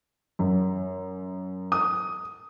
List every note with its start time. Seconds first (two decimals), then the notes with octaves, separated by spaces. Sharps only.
0.39 F#2
1.72 D#6